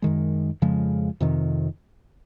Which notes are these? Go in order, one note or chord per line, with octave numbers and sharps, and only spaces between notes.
F#2 D#3 G#3
F2 C#3 F3 G#3
F2 C3 D#3